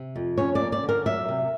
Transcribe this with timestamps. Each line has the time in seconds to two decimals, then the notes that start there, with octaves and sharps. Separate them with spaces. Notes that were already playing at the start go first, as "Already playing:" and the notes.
Already playing: C3
0.16 F2
0.38 C#4 C#5
0.55 D5
0.60 A#3
0.72 D5
0.83 D3
0.89 A#4
1.06 F#3 E5
1.29 C3